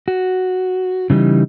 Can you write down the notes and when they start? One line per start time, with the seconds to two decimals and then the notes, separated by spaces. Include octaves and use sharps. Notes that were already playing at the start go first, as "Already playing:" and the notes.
0.08 F#4
1.10 C#3 E3 G3 D#4